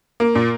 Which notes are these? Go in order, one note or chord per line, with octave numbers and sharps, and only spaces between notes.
A#3
A#2